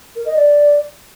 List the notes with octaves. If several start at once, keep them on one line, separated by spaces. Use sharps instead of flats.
A#4
D#5
D5